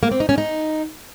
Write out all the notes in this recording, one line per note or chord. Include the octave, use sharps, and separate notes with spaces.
A#3
C4
D#4
C#4
D#4